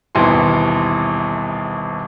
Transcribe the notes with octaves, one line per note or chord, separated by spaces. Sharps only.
D#1 G#1 D#2 B2 E3 C6